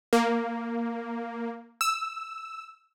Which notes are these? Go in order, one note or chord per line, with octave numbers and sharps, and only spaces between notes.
A#3
E6